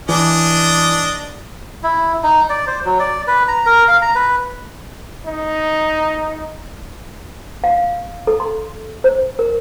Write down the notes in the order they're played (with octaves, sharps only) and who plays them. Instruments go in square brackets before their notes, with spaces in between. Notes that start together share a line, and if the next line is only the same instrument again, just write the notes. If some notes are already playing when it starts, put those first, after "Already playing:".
[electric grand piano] E3 [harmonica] D4 D#5
[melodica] E4
D#4
D5
C5
F#3
D5
B4
A#5
A#4
F5
A#5
B4
[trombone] D#4
[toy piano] F5
A4
C6
C5
A#4